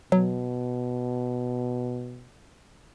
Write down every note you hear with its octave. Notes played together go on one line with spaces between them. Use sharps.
B2 F#3